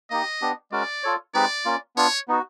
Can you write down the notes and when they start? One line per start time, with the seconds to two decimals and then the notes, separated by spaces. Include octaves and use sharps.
0.10 A#3 D#4 G4 D#5
0.42 B3 D4 G4
0.71 G#3 C#4 F#4 A#4 D5
1.03 F4 A4 C#5
1.34 G#3 C4 D#4 G4 B4 D5
1.65 A#3 C#4 F4
1.96 B3 D4 F4 C#5
2.28 B3 D#4 F#4